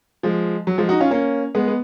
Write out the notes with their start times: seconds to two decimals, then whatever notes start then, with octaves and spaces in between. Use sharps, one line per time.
0.23 F3 G#3
0.67 F#3
0.78 F3 G#3
0.89 D#4 F#4
1.00 C#4 F4
1.10 A#3 C#4
1.55 G#3 B3
1.68 B3